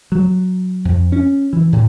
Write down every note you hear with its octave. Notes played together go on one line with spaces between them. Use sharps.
F#3
F2
C#4
E3
A2